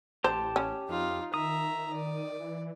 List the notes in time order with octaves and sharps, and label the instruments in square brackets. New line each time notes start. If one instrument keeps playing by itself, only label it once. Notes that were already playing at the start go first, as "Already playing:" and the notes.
[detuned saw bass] A1 [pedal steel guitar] G4 A5 [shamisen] C5
[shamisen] C#4
[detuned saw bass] F2 [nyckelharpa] D#4 F4
[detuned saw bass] D#3 [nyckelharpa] E5 A#5 [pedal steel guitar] D#6
[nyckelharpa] D5
[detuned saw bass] E3